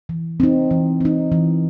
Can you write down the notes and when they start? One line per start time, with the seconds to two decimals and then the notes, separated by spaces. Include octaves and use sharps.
0.09 E3
0.40 C4 D#4
0.71 E3
1.01 C4 D#4
1.32 E3